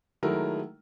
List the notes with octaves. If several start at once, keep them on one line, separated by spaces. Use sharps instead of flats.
D#3 F#3 G#3 A3 E4 A#4